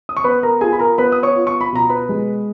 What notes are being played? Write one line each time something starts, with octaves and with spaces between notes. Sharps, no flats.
D#6
C#6
B3 B4 B5
A#4 A#5
F4 G#4 G#5
B5
A#4 A#5
B3 B4 B5
D#6
C#5 C#6
F4
C#6
B5
B2 A#5
B4 B5
G#3